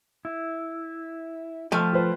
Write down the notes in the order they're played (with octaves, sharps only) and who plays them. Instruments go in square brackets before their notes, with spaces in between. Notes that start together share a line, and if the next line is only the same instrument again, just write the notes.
[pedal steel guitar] E4
[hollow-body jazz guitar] F3 A3 D#5 [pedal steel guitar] G5 F6
[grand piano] F4 B4 C5